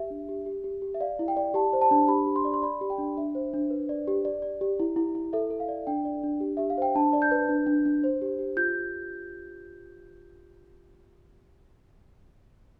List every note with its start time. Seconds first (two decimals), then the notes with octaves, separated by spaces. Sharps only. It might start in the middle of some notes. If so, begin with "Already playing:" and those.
Already playing: G4 E5
0.10 D4
0.29 G4
0.46 G4
0.64 G4
0.82 G4
0.95 E5
1.00 D5 F5
1.19 E4
1.28 G5
1.37 D5
1.54 G4 A5
1.73 C5
1.81 A5
1.91 D4
2.08 G4 B5
2.27 G4
2.36 C6
2.45 D5
2.54 C6
2.62 D5 B5
2.81 G4
2.90 G5
2.98 D4
3.17 D4 E5
3.35 C5
3.53 D4
3.70 B4
3.89 D5
4.07 G4
4.25 D5
4.42 D5
4.61 G4
4.80 E4
4.96 E4
5.15 E4
5.33 A4 E5
5.50 A4
5.60 F5
5.69 D5
5.87 D4 G5
6.05 D5
6.23 D4
6.40 G4
6.57 G4 E5
6.70 F5
6.78 C5 G5
6.95 D4 A5
7.13 D5
7.22 G6
7.31 B4
7.49 D4
7.67 D4
7.86 D4
8.04 C5
8.22 G4
8.39 G4
8.57 F4 G6